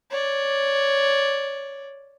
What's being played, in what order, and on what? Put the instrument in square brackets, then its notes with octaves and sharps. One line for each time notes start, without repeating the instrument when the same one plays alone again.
[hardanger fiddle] C#5 D5